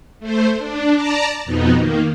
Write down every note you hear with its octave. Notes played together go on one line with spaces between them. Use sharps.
A3 C5
D4
D5 A5 A#5
F2 B2 B3 D#4
D#3 A#3